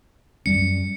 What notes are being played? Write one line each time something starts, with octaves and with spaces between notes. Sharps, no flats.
F#2 G3 C#4 C#7